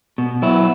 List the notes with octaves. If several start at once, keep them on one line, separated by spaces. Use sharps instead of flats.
B2
F#3 B3 E4